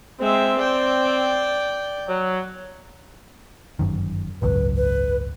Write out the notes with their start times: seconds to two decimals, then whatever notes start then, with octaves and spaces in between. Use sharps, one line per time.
0.20 G#3 C4 E5
0.59 D5 G5
2.08 F#3
3.79 G1 F#2 D#3
4.42 G#1 C#2 F#2 B4
4.77 B4